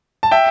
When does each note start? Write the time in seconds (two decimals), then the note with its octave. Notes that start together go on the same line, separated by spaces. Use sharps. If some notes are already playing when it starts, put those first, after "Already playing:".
0.23 A5
0.31 E5 G5